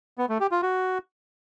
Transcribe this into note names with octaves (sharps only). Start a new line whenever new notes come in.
B3
A3
G4
F4
F#4